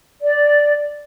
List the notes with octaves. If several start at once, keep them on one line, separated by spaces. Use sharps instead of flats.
D5